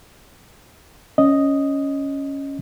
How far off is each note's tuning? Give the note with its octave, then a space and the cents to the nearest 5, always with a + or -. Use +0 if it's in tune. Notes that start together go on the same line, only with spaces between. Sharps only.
C#4 +0 D#5 +0